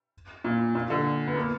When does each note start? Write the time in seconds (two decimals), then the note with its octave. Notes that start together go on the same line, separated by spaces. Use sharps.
0.44 A#2
0.75 A#2
0.90 D3
1.27 B3
1.36 A#3